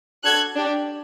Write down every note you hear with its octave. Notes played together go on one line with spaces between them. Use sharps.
D4 F#4 A4 F#6 G#6
D4 G4